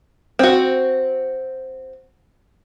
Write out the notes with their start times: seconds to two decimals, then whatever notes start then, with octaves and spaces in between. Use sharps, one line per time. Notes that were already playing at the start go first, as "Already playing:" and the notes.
0.39 C4 F#4